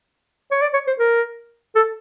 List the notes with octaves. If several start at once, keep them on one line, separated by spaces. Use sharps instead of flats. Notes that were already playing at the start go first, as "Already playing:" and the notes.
C#5
D5
C#5
C5
A#4
A4